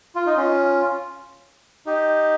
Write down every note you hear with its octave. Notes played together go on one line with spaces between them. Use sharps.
F4
D#4
C#4 F4
D#4 G4